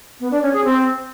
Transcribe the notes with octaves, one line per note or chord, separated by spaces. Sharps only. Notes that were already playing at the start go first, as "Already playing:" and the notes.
B3
D4
C#4
G#4
C4